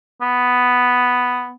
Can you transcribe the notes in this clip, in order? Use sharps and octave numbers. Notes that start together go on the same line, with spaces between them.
B3